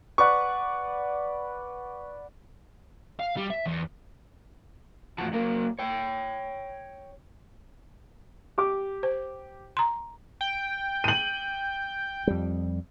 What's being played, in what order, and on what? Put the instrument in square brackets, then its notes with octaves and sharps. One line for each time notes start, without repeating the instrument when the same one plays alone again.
[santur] B4 D5 F#5 [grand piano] C#6
[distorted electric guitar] F5
G3
E5
E2
[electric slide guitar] E2 A2 F3 F#4 A5
F#3 A#3 A#4
C#5 G5
[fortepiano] G4 D6
[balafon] C5
A#5 C6
[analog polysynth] G5
[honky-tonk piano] D#7 F#7
[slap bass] F2 G3